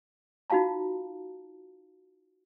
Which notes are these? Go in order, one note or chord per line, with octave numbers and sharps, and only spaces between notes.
D#4 F4 F#4 F5 A5 A#5